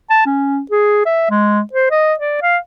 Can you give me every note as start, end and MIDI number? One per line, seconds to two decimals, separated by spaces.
0.10 0.24 81
0.26 0.61 61
0.71 1.03 68
1.06 1.29 76
1.30 1.61 56
1.73 1.90 72
1.91 2.14 75
2.20 2.42 74
2.42 2.57 77